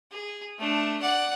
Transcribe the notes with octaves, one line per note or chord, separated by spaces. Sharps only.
G#4
A3 D4
D5 F#5